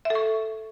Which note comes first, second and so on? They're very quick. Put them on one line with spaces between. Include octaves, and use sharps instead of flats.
E5 A4 C#6